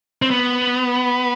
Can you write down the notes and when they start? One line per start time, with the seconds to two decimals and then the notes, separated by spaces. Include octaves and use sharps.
0.22 C4
0.31 B3